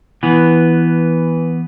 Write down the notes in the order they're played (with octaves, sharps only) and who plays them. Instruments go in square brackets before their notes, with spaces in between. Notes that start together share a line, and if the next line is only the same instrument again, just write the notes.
[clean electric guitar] E3 B3